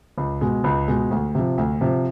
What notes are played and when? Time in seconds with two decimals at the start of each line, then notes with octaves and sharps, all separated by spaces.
0.18 C#2
0.41 B2 G#3
0.64 C#2
0.88 B2 G#3
1.11 D2
1.35 C3 F3
1.58 D2
1.81 C3 F3